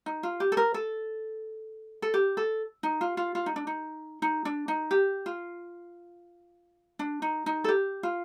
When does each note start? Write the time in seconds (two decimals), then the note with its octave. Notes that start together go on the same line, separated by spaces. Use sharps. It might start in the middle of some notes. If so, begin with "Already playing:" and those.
0.06 D#4
0.23 F4
0.40 G4
0.52 A4
0.57 A#4
0.74 A4
2.02 A4
2.14 G4
2.37 A4
2.83 D#4
3.01 F4
3.17 F4
3.35 F4
3.46 D#4
3.56 D4
3.67 D#4
4.22 D#4
4.45 D4
4.68 D#4
4.91 G4
5.26 F4
6.99 D4
7.22 D#4
7.46 D#4
7.64 A4
7.68 G4
8.03 F4